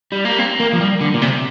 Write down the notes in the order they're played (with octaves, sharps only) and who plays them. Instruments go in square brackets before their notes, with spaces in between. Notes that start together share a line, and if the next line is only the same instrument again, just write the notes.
[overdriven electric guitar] G3
A#3
C4
A#3
F3
G3
D3
A#2
C3